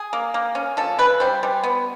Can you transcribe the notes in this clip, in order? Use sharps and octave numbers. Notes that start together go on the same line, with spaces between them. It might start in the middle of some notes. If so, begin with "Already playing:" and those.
Already playing: G#4
A#3
A#3
C#4
F3 A4
C#3 B4
G3 C5
G3
B3